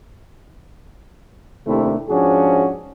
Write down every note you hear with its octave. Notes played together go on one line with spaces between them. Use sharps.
D#2 C3 A3 C4 D4 E4
G#2 F3 C#4 D4 F#4 G#4